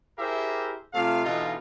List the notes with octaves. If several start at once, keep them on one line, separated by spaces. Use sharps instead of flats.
E4 G4 G#4 A#4 C5 E5
C3 A3 F4 F5
B2 D3 E3 D#4 F4